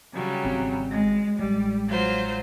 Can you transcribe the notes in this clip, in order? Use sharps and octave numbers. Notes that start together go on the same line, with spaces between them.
C#3 F#3 G3
G#1 C4
G#3
A1 G3 G#3
F#3 F4 C5